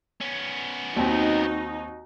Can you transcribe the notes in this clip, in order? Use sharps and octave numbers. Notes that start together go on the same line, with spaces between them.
B3 C#4
D#2 C4 D#4 F#4